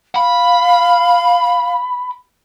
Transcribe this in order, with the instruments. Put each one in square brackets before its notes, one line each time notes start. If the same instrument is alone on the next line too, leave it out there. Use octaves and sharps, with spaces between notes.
[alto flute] F5 [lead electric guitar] B5